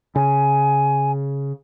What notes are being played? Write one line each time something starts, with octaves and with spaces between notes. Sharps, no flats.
C#3 G#5